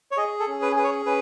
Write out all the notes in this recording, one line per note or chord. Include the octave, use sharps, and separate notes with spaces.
C#5
G#4 D#5
A4
C#4
B4
G#4 B4
C#5
C#4 B4